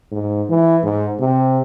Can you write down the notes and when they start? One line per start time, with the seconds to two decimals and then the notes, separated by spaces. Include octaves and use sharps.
0.12 G#2
0.50 E3
0.84 G#2
1.20 C3